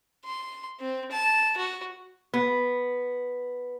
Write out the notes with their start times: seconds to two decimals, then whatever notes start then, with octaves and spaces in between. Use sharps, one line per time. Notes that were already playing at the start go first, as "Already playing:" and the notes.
0.25 C6
0.79 C4
1.11 A5
1.57 F#4
2.34 B3